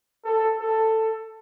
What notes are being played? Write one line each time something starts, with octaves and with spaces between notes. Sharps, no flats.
A4
A4